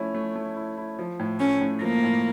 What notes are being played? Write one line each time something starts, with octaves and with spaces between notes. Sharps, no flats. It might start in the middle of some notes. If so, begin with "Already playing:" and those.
Already playing: F3 A3 C#4 E4
A3
A3
E4
E4
F3
A2
A3 C#4
A2
F3 A#3
A2